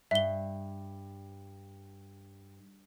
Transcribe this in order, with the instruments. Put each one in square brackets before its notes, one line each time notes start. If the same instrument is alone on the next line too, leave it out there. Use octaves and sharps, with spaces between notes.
[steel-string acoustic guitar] G2 [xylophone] E5 G7